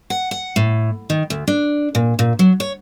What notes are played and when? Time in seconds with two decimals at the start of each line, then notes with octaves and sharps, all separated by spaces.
0.10 F#5
0.31 F#5
0.56 A2
1.10 D#3
1.30 D2
1.48 D4
1.95 A#2
2.19 A#2
2.39 F#3
2.60 C#5